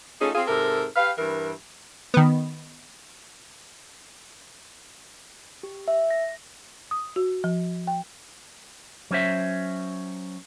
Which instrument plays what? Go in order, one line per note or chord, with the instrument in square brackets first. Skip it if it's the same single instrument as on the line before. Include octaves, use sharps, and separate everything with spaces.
[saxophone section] A3 C#4 D#4 F4 G#4
C4 F4 G#4
G#2 C3 A4 A#4
G4 B4 F5
G2 E3 A#4
[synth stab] D#3 B3
[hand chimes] G4
E5
A#6
[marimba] D#6
F#4
F3
G5
[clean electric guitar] F#3 C#4 C5 E5